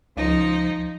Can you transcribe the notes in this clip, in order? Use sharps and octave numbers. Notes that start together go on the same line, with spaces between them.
C#2 F3 D#4